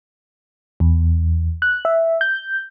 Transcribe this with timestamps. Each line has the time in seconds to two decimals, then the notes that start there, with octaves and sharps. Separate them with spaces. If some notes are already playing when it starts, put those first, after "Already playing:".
0.80 E2
1.62 F#6
1.85 E5
2.21 G6